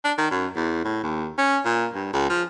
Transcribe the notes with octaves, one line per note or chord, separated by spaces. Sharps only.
D4
D#3
F#2
E2
A2
D#2
C#4
A#2
G2
C#2
F3